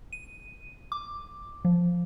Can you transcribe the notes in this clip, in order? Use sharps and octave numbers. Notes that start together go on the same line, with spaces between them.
D#7
D6
F3